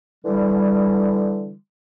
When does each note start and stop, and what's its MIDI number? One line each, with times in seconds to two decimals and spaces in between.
0.25 1.55 50
0.25 1.55 52
0.25 1.55 55